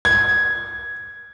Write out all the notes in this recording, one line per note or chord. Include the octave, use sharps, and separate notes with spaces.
G#6